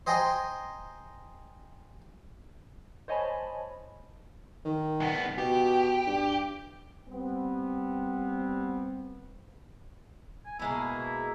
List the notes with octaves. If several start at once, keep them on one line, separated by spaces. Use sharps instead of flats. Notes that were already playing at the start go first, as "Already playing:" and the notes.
C5 D#5 G5 G#5 A#5 C6
C5 C#5 D#5 G#5 A5 B5
D#3
C2 B3
B2 G4
G2
G3 B3 C4
G#5
B2 G#3 A#3 E4